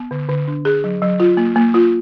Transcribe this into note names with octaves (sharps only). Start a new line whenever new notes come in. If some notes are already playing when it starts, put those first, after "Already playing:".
Already playing: B3
D3
D3
D4
G#4
F#3
F#3
F4
A#3
A#3
F4